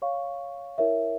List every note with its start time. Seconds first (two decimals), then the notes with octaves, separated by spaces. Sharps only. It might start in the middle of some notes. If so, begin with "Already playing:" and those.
0.02 C#5 F5 C#6
0.78 E4 A#4 C#5 E5